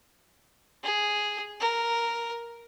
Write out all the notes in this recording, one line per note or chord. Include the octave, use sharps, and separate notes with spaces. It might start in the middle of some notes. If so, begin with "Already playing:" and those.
G#4
A#4